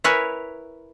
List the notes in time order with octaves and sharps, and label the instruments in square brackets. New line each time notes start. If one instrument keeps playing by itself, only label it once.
[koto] E4 A#4 B4 C#5 G#5